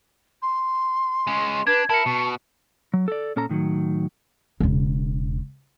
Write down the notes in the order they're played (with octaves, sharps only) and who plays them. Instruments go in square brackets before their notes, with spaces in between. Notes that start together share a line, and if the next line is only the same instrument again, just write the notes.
[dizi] C6
[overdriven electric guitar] G#3 C#4
[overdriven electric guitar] D4 [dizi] B4 [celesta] G#6
[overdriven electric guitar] E4 [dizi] A#4 [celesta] A5 C#7
[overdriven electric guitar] B2 [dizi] C#6
[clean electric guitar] F#3
A4 D5
A#2 C#4 A4 A5 A#5
A2 D#3 E3 F#3
[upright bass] E1 C#3